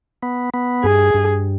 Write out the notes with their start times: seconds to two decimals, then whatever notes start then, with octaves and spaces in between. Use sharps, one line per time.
0.23 B3
0.54 B3
0.84 G2 G#4
1.14 G2